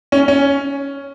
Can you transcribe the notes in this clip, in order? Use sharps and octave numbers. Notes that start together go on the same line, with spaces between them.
C#4
C#4